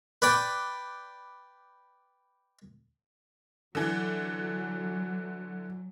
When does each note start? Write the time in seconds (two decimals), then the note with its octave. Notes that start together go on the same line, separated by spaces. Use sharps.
0.22 B4 D5 G5
3.75 D3 E3 F#3